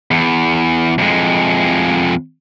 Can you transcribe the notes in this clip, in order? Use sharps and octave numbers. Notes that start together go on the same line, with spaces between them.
E2
F2 G#3